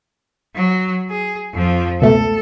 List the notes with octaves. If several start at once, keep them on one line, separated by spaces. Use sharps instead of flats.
F#3
G#4
F2 F3
C#2 B2 A3 A4